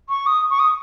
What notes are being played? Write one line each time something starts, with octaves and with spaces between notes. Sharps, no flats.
C#6
D#6
C#6
D#6